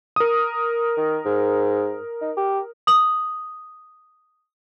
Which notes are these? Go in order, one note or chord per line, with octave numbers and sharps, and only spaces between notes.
A#4 D#6
D#3
G#2
D#4
G4
D#6 F#7